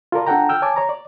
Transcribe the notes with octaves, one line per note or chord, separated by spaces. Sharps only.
F4 A4 A#4 D5
D4 F4 A4 F#5 G5 A#5
G5 E6 F6
C#5 G#5 A5 D6
C#5 A#5
D5